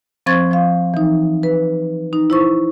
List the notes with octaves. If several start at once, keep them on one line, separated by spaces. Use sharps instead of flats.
F3 C4 C5 C#6 G#6 A6
F3 F5
E3 D#4
B4
D#4
E4 C5 C#6